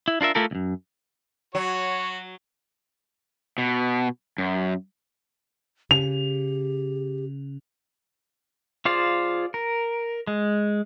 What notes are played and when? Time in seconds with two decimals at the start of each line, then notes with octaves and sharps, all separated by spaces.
0.08 E4
0.21 D4 F4 A#4 E5
0.35 A3 E4 F4 G4 A4 A#4
0.51 C#2 F#2
1.55 F#3 F#4 C#5
3.58 B2
4.38 F#2
5.91 C#3 G4 F7
8.85 F4 G#4 C5 D5 F5
9.54 A#4
10.27 G#3